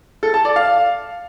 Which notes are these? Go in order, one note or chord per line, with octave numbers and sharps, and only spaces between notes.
A4
A5
D5
F5